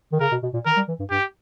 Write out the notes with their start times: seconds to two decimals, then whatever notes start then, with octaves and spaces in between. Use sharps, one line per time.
0.13 D#3
0.20 C#3 A#4
0.32 B2
0.43 B2
0.54 A#2
0.66 D#3 A#4
0.77 G3
0.88 E3
0.99 G2
1.11 G2 G4